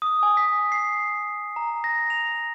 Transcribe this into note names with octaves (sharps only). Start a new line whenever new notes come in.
D#6
G#5
B6
C7
A#5
A#6
F7